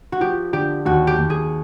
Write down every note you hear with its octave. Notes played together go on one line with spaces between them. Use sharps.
F#4
F3 G4
D3 G4
D#2 F#4
G4
D#2
G#4